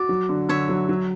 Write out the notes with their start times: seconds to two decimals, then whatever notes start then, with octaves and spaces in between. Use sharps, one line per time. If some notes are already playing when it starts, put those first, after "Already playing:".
Already playing: F#4 D5
0.09 F#3
0.29 D3
0.49 D3 C#5 E5
0.69 F#3
0.89 F#3